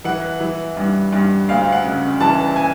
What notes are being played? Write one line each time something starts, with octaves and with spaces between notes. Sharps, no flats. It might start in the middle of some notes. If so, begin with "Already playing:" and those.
E3 F#5
E3
G2
G2
D2 F5
F#5
C#3
E3 A5
G#5